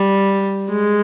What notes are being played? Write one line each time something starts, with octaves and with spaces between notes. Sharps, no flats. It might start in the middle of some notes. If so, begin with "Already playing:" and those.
Already playing: G3
G#3